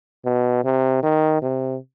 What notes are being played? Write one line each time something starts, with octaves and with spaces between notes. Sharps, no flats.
B2
C3
D#3
C3